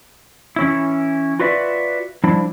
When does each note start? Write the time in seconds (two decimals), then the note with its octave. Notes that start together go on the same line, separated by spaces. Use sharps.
0.56 E3 C#4 E4
1.39 F4 F#4 B4 D5 E5
2.24 F3 G3 D4 E4